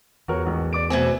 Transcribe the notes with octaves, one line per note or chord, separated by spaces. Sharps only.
E2 F#4 A#4 C#5
A1 F#4
D5 D6 D7
B2 A3 C4 G#5 G#6